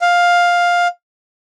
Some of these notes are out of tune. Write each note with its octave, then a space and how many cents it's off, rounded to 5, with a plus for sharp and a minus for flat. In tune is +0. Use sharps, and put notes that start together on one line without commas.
F5 +10